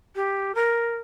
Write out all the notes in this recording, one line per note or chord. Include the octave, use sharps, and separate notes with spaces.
G4
A#4